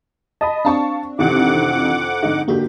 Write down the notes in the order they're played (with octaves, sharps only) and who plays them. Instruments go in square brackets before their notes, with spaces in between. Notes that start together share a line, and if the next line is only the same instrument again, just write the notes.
[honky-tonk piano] D#5 B5 [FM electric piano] A5 D#6
[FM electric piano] C4 D4 [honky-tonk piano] F5 A5 C#6
[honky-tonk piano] A1 C3 D#3 [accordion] F2 F#5 D6
[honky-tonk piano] G#2 D3 D#4
[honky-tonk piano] G#2 D3 G4 [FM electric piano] A#3 F#4